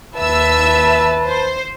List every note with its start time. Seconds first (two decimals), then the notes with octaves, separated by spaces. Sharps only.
0.18 D#2 B4 E5 A5 E6
1.27 C5